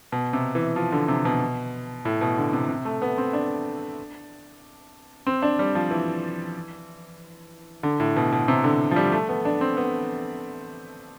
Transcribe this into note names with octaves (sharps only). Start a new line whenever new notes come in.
B2
C3
E3
F3
D3
C3
B2
A2
B2
D3
C3
C3
A3
B3
C4
D4
C4
D4
G3
F3
E3
D3
A2
B2
B2
C3
D3
F3
G3
A3
B3
D4
C4
B3